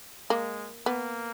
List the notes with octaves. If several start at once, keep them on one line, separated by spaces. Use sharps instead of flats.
G#3 A#3
A#3 B3